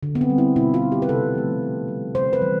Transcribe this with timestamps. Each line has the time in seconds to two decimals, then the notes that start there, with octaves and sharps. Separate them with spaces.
0.03 D3
0.15 B3
0.21 C4
0.30 G3
0.38 E4
0.56 B2 E4
0.74 F4
0.82 G3
0.92 G4
1.02 B4
1.09 C3 A4
1.35 F3 A3
1.62 C3
1.88 G3
2.15 C3 C5
2.33 B4
2.42 E3 G3